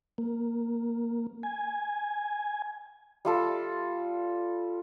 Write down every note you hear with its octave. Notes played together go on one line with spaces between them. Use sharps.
A#3
G#5
G3 F4 A4